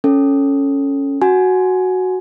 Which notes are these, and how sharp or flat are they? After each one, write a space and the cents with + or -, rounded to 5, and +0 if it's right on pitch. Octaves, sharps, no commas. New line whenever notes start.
C#4 +0 A4 +0
F#4 +0 G#5 +15